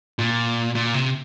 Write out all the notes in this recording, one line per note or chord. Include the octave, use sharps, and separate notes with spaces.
A#2
A#2
C3